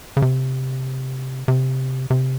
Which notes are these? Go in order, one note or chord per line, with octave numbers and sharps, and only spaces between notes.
C#3
C3
C3
C3